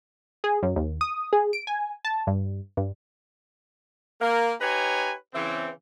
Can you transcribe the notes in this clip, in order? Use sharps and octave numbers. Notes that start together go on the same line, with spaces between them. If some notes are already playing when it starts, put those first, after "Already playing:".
G#4
F#2
D#2
D#6
G#4
D7
G#5
A5
G2
G2
A#3 A#4
D#4 G4 B4 C#5 G#5 A#5
C#3 E3 C4